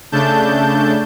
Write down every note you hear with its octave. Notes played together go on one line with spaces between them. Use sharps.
C#3 A3 D4 A5 G6